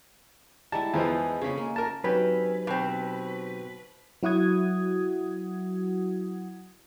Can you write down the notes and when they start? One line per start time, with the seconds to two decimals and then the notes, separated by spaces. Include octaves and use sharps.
0.72 G3 G#3 E4 A5
0.94 E2 E3 F3 D#4 G#4
1.41 C#3 G#3 C#4 B5
1.58 A#3
1.76 A#4 A5
2.04 F#3 C4 C#4 D#4 G4 B4
2.67 B2 C4
4.23 F#3 E4 F#4 F#5 D#6 G#6